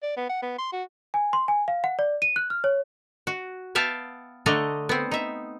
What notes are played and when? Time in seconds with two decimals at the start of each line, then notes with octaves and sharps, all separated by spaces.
0.03 D5
0.17 B3
0.29 F#5
0.42 B3
0.59 C6
0.72 F#4
1.14 G#5
1.33 C6
1.48 G#5
1.68 F5
1.84 F#5
1.99 D5
2.22 D#7
2.36 F#6
2.50 F6
2.64 C#5
3.27 F#4
3.75 B3 E5 F5 G5 A5
4.46 D3 A3 D4 D#5 A#5
4.89 B3 C4
5.11 D#4 E5